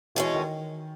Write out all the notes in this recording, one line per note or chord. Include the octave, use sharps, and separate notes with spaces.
B2 E3 G#3 C#4
D#3